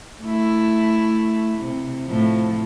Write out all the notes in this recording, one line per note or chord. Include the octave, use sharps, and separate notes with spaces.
A3 E4
C3
A2 F3